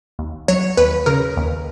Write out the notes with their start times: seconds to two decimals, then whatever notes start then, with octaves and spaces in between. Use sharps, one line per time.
0.19 D#2
0.48 F#3 C#5
0.77 D#2 B4
1.06 C#3 A#4
1.37 D#2